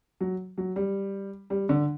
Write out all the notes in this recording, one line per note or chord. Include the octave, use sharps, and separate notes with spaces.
F#3
F#3
G3
G3
D3